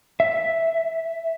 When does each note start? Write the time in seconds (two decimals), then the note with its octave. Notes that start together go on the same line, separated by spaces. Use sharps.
0.20 E5